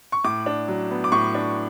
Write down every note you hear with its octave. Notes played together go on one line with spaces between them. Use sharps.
C#6
A2 D6
D4
F#3
B3
D6
A2 C#6
D4